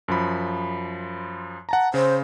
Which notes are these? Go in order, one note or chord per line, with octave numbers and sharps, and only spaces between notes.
F#2 F3 B5
F#5 A5 A#5
C#3 C5